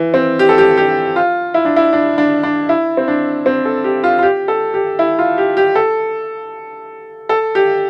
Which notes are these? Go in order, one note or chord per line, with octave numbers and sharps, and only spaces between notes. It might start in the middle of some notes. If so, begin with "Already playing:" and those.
Already playing: E3
C4
G4
A4
G4
G4
F4
E4
D4
E4
D4
D4
D4
E4
C4
D4
C4
A4
G4
F4
F4
G4
A4
G4
E4
F4
G4
G4
A4
A4
G4